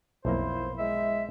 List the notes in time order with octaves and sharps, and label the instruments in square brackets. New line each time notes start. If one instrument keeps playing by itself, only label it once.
[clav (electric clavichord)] B1 F2 A#3 [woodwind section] E4 C5
[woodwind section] G#3 E5